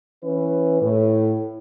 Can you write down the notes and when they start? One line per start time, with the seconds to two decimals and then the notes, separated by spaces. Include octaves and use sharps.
0.24 E3 C#4 B4
0.82 A2